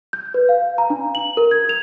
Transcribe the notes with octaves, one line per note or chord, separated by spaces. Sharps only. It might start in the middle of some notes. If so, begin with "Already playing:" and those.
G6
B4
F5
A#5
D4
F#7
A#4
G#6
F7